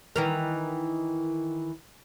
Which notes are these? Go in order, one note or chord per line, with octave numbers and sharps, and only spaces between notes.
D#3 E3 A#4